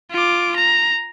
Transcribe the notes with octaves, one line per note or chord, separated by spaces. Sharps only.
F4 D6
A#5